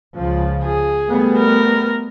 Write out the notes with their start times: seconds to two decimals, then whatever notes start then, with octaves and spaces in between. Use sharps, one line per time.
0.15 C#2 C#3 F3
0.65 G#4
1.08 G3 A3 B3
1.38 A#4